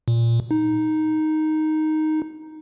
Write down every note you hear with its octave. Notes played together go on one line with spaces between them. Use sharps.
A#2
D#4